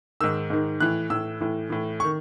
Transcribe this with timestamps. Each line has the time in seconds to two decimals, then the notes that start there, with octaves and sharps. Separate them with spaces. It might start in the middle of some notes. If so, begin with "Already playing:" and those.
0.21 G#2 D#3 E6
0.50 G#2 D#3
0.80 A2 E3 F#6
1.10 A2 E3 E6
1.41 A2 E3
1.70 A2 E3
2.00 C#6
2.04 D#3